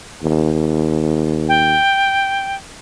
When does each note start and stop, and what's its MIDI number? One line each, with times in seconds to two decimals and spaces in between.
0.22 1.78 39
1.49 2.56 79